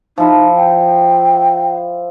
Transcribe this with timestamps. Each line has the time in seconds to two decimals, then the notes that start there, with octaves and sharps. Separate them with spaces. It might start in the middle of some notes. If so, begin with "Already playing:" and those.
0.18 F3 D#4 E4
0.56 G5